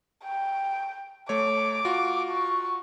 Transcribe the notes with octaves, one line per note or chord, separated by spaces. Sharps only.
G5
A3 C#5 D6
F4 F#4
C#6